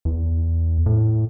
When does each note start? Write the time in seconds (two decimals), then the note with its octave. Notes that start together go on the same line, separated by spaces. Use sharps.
0.05 E2
0.86 A2